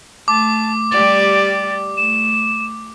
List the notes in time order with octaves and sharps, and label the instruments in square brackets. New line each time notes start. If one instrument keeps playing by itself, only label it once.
[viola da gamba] A3 [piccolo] A5 [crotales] D6
[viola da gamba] G3 G4 D5 [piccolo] A6
[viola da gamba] A3 [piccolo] E7